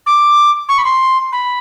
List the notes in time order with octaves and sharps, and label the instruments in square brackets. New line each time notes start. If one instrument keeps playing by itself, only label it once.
[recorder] D6
C#6
B5
C6
B5